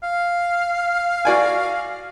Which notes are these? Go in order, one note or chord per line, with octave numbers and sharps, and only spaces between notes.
F5
F#4 D5 G#5